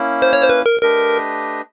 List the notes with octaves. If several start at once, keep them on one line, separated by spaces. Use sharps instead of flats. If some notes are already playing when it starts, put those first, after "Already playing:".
Already playing: A#3 C#4 E4
C5
C#5
C5
B4
A#4
A3 D4 G4 A#4 B4 D#5